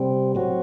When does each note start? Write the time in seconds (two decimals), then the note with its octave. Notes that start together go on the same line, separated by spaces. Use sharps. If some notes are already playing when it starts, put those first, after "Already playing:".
Already playing: C3 G3 C4
0.35 A2 F#3 C4 F#4